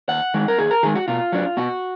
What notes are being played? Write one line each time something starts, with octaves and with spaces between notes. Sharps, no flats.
D#2 F#5
D#3 G#3
A#4
D#2 G#4
A#4
D#3 G#3 G#4
F#4
B2 F4
F#3 D4
B2 F#4